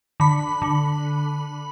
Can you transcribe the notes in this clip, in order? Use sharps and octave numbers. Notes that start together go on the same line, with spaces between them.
D3 B5
D3